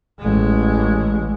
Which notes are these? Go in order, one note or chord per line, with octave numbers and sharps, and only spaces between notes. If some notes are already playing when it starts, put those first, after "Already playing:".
A1 G#3